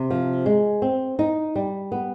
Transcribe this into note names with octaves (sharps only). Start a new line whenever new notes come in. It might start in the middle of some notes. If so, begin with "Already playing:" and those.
Already playing: C3
F3
G#3
C4
D#4
G3
B3